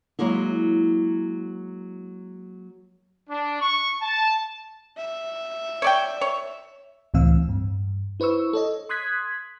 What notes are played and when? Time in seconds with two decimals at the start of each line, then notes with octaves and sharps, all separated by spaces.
0.19 F#3 G#3 A#3 E4
3.29 D4
3.61 C#6
4.01 A5
4.98 E5
5.82 C#5 D5 G5
6.21 C#5
7.14 C#2 A2 E3 C4 F5 E6
7.49 G2
8.20 E4 B4 C5 C#6 E6
8.53 A4 C#5 D#5
8.89 C6 D#6 F#6 G#6 B6